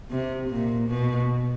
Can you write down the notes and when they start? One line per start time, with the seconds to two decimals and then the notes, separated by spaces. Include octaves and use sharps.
0.11 C3
0.50 A#2
0.89 B2